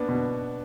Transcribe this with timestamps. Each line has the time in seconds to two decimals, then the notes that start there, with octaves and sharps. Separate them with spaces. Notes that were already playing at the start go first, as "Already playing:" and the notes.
Already playing: A#3 B3 D4
0.09 B2